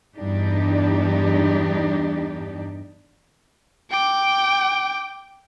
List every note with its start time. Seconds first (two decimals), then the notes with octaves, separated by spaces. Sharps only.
0.16 E2 G2 E3 D4 D#4 G4
3.91 G5 D6